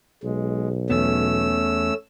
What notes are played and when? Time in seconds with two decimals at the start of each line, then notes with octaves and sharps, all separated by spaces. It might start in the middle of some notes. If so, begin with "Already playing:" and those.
0.23 B1 G#3
0.90 E2 A3 B3 C#4 E6